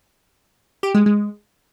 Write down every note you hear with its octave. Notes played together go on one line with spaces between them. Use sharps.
G4
G#3
G#3